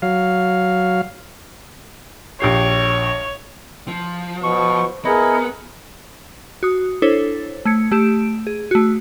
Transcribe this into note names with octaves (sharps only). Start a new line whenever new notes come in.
F#3 F5
A#1 G4 C#5 C7
F3
B2 C5 C#6
B3 E4 G#4 A#4 D#5
F#4 D#6
D4 E4 A4 C5 C#5
A3 G#6 C#7
A3 G4 D7 E7
G#4
A3 F#4